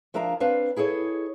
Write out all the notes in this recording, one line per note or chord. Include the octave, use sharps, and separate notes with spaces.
F3 D4 A#4 E5 F5 A#5
C4 D4 B4 F5
E4 G#4 A4 C#5 D#5